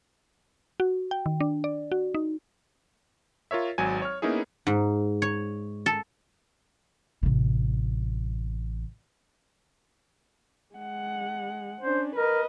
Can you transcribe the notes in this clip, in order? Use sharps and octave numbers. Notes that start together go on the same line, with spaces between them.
F#4
G5
D#3
D4
D5
F#4
D#4
F4 A#4 C#5 E5
G#1 F#3 G#5
C#5 F6
A#3 B3 C#4 D#4 E4 G#4
G#2
C#5
A4
A1 C3
G#3 F#5
C#4 D4 C5
A#4 B4 D#5